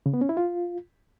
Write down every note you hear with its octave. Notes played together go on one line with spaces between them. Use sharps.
C#3
B3
C#4
E4
F4